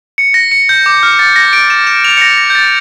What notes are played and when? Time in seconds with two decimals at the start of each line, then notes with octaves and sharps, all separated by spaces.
0.18 C#7
0.34 A#6
0.52 C#7
0.69 G6
0.86 D6
1.03 F6
1.19 A6
1.36 A#6
1.53 D7
1.70 E7
1.87 E7
2.05 F7
2.17 C#7
2.21 A#6
2.37 A#6
2.50 G6
2.55 A6